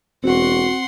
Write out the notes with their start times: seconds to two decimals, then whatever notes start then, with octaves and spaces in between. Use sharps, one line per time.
0.24 E1 C4 F#4 F#5 C6